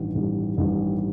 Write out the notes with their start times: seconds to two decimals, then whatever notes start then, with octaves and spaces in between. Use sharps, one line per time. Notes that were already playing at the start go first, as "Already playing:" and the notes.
Already playing: A1 G2 D#3 G3
0.15 A1 G2 D#3 G3
0.58 A1 G2 D#3 G3